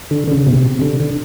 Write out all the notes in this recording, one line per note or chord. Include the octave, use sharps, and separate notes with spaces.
D3
D3
C#3
B2
C3
D3
D3